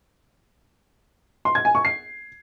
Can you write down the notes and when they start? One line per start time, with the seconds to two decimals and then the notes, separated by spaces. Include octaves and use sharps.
1.45 C6
1.55 G#6
1.65 G#5
1.75 C#6
1.85 C7